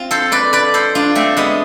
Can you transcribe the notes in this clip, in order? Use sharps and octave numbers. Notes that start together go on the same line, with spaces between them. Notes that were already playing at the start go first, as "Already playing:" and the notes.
Already playing: C4 F4
A4 C5
B4 D5
B4 D5
A4 C5
D4 F4
A3 C4
G#3 B3